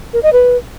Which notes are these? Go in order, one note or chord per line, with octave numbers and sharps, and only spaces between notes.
A#4
D#5
B4